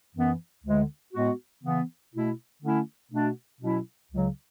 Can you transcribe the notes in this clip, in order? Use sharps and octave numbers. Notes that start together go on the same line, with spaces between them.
F#2 E3 B3
D2 D3 G#3
A2 G#3 B3 F#4
C#3 E3 B3
B2 A3 E4
D3 A3 C#4 E4
B2 A3 D4 F#4
B2 F#3 C#4 E4
C#2 C#3 F#3